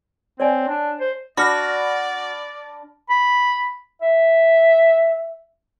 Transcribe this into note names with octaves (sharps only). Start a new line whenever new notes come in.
C4 C#5 D5 G#5
D4
C5
D4 F#4 D5 B5 F6 A#6
B5
E5